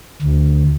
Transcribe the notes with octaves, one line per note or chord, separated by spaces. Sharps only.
D2